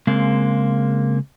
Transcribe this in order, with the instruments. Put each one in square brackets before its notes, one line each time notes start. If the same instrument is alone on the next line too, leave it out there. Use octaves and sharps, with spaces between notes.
[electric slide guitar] C#3 G#3 A#3 C4